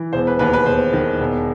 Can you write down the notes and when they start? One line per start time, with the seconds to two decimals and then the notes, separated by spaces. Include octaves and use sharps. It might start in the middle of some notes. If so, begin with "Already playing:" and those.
Already playing: E3
0.13 E1 C5
0.27 B4
0.39 D#2 B4
0.53 B4
0.66 E1 C5
0.93 D#3
1.20 E1